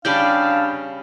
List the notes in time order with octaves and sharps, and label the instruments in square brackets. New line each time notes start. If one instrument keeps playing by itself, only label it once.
[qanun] C#3 G3 D5 [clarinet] D4 [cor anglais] F5 [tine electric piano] B5 G6